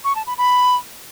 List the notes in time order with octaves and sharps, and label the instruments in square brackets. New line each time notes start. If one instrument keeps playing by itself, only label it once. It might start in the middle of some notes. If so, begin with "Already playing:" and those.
[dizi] C#6
A5
B5
B5